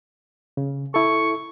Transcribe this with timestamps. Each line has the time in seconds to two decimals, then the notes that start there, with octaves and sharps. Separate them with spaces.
0.57 C#3
0.94 E4 A4 C#6